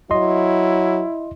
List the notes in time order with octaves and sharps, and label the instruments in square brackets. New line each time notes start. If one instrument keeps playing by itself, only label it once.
[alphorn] F#3 [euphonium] E4 [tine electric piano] D#5 C6